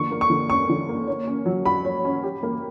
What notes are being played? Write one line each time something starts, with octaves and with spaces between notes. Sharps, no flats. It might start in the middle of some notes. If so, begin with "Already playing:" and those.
Already playing: D3 A#3 C#6
A#3
C#6
D3
C#4 C#6
D3
A#3
C#5
C#4
F#3
F#4 B5
C#5
C#4
G4
A#3